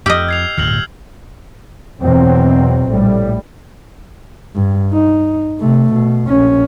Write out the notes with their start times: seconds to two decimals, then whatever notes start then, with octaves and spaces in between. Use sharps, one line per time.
0.06 F2 G4 D#5 E6 F6 G6
0.28 G#6 C7 F7
0.58 D1 G2 A#2 F6 F#7
2.01 E2 B2 F#3 C4
2.89 A#1 A2 G3
4.55 G2
4.92 D#4
5.60 C3 A3
5.93 B2
6.28 A#1 C#4